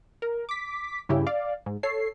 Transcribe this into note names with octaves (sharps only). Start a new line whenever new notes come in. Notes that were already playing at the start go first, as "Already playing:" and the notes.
A#4
D6 B6
G2 C#3 E4 G4
D5 F5
G#2
A4 C#5 C7